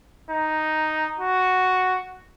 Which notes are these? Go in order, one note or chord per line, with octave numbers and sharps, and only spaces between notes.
D#4
F#4